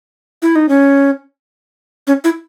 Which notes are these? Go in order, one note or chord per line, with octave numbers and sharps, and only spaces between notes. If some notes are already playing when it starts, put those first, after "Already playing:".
E4
D#4
C#4
C#4
E4